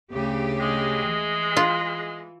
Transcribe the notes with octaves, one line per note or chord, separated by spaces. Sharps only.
D2 C#3 G4
G#3
E3
F4